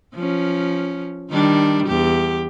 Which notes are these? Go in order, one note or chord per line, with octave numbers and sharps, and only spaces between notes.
F3 C#4
D#3 G3 D4
E2 G4